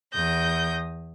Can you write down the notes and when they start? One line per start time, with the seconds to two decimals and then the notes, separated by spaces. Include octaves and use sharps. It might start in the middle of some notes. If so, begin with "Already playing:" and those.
0.12 E2 D#6 G6 A#6